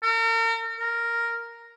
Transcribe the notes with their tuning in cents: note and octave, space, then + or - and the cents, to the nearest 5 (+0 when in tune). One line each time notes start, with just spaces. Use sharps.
A#4 -40
A#4 +0